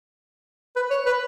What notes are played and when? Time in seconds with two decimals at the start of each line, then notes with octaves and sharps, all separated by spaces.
0.76 B4
0.90 C#5
1.06 B4